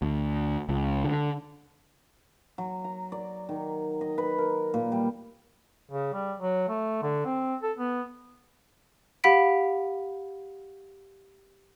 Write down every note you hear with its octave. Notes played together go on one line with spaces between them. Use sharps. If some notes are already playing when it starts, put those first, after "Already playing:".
D2
C#2
D3
F#3
A#5
D5
D#3
D#5
B4
A#4
A#2
G3
C#3
G3
F#3
A3
D3
C4
A4
B3
G4 F5 F#5 B5 B6 D7